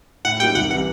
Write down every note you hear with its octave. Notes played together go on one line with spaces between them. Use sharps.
A2 F#5
F#3 A#3 D#4 G4 G5
C2 F#5
C3 E3 F#5